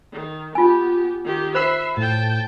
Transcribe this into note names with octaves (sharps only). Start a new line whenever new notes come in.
D#3
B3 F4 G4 G#5
D#3 G4
C5 E5 B5 E6 C7
A2 G5 A5